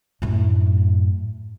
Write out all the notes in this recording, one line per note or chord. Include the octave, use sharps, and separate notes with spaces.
F#2 A2